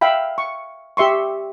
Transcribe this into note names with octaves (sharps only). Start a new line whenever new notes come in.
E5 F5 G5 B5
C#6
G4 E5 C6 C#6